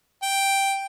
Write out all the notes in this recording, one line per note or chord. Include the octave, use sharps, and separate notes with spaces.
G5